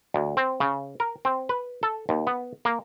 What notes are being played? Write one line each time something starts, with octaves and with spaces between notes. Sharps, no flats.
D2
C4
C#3
A#4
C4
B4
A4
D#2
B3
A#3